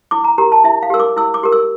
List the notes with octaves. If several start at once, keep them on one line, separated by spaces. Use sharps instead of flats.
E4 D6
A#5
G4 A#4 A#5
A5
E4 E5
F5
G4 A#4 E6
D6
E4 E6
D6
G4 A#4
E6